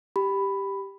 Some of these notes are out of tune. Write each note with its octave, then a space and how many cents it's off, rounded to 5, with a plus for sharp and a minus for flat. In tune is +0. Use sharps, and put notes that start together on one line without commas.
G4 +0 B5 +5